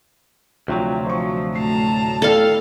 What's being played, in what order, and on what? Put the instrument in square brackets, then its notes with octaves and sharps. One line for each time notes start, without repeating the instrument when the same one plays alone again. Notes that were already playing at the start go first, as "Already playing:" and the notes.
[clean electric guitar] D2 C3 F#3 [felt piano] F3 G5
[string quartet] F3 [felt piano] C5 C#6
[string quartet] A2 A5 A#5 [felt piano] C7
[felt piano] E4 D5 G5 [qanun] A4 F5